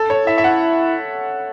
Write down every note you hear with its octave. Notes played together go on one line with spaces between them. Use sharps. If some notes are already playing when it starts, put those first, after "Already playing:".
Already playing: A4
C#5
E4 E5
E5
F#5